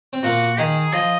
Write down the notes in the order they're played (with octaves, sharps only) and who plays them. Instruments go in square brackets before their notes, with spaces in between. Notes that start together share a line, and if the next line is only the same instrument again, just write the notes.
[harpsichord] C4
[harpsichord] A#2 A#3 [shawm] F#4
[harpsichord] D#3 [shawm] G#4
[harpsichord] F3 [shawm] D#5